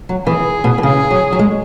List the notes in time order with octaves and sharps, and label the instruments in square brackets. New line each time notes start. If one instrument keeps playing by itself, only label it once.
[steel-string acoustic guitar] F#3
[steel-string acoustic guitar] E3 [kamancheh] G#4
[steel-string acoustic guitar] B2
E3
[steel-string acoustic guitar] C#3 [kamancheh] G#4
[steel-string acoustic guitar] F#3
F#3
G#3